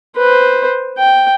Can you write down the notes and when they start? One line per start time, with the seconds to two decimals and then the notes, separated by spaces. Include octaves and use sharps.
0.16 B4 C5
0.98 G5